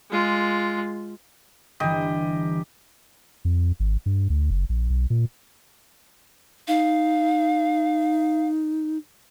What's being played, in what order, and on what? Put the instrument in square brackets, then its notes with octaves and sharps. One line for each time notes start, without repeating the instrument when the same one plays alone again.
[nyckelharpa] G#3 F4
[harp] G1 E3 [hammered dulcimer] G4 D#5
[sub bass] F2
G#1
G2
D2
F#1
A#1
B1
A#2
[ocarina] D#4 [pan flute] F5